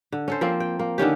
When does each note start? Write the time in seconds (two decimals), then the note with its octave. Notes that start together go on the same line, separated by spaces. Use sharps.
0.12 D3
0.28 C#4 A4 C5
0.41 F3 A#3 C4
0.60 G5
0.79 A#3
0.98 D3 D#3 C#4 G4